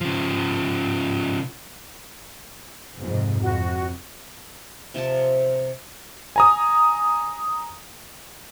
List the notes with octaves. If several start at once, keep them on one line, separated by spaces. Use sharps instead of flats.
C#3 F3
F2 G#2 C3
F2 F#4
C3 F3 C4 A5
G#5 A#5 D#6